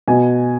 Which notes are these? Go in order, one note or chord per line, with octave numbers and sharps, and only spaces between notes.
B2 G#5